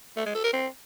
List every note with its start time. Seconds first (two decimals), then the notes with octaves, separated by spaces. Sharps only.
0.17 A3
0.26 G#3
0.35 A4
0.44 A#4
0.53 C4